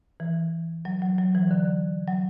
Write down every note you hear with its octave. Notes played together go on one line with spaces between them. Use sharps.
E3
F#3
F#3
F#3
E3
D3
F#3